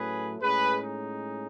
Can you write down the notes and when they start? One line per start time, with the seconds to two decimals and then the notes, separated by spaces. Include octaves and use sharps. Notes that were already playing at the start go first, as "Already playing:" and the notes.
Already playing: A2 F#3 A3 C#4 G#4 B4
0.41 A2 G#3 C#4 G#4 B4
0.81 D#4